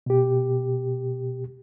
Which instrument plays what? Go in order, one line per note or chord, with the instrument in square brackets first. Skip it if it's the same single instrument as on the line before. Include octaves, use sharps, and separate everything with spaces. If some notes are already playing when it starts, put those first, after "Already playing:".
[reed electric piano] B2 G4